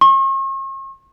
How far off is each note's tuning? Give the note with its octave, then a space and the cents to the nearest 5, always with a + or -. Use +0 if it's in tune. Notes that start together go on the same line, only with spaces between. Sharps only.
C#6 -45